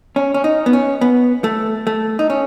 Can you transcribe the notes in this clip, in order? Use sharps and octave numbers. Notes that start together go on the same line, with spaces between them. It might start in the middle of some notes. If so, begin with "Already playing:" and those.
C#4
C#4
D#4
B3
C#4
B3
A3
A3
D#4
C#4